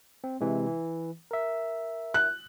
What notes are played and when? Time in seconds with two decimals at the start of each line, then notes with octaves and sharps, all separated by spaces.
0.24 C4
0.41 C3 E3 G#3
0.67 E3
1.31 A#4 E5
2.14 F#6